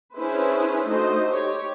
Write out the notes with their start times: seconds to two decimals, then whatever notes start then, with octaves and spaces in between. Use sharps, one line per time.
0.16 C#4 D4 E4 G#4 B4 C5
0.88 A3 D#4 F#4 C5 D#5
1.29 G4 C#5